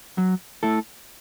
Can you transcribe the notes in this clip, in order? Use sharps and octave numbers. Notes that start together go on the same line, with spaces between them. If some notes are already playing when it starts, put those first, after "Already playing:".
F#3
A3 E4 A4